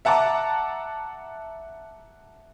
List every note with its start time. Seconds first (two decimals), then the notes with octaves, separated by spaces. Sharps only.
0.05 E5 F#5 A5 A#5 D6